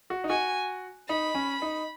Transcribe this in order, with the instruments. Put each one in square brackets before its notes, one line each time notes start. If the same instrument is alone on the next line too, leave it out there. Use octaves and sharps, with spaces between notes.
[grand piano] F#4
D#4
[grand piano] F#4 [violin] G#5
[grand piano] D#4 [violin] B5
[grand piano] C#4
D#4